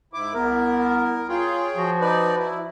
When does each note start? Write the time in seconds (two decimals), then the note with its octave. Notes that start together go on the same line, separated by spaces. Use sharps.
0.13 G#2 E4 D6
0.34 C2 B3 E4 A#4
1.29 F4 G#4 C#5 G5
1.77 F3 F#4
2.01 D#4 B4 D5
2.39 E4